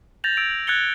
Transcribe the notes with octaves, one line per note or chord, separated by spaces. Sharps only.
G6 A6 A#6 F7 F#7
E6 G#6 D7 F7
F#6 G#6 A6 C#7 F7 G7